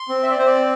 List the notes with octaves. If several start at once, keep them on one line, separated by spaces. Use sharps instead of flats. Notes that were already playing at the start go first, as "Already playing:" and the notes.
Already playing: C6
C4
E5
D5
C4 C5
D5